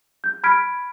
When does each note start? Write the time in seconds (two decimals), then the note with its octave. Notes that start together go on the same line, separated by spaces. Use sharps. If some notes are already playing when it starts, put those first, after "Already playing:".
0.24 G6
0.44 B5 F6 G#6 B6 D7